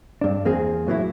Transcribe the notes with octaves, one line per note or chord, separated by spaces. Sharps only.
G2 D4
E2 A#3 C4 G#4
A2 F#3 A#3 E4